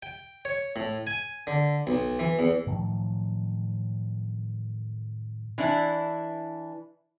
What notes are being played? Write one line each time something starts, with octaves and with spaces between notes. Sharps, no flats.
G5
C#5
A2
G#5
D3
B1
E3
E2
A2 D#3 F3 F#3
E3 D4 E4